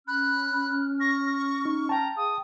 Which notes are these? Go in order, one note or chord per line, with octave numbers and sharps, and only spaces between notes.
C#4 B5 F6 F#6
C#6 A#6
D#4
G5 A5 A#5
G#4 F5 D#6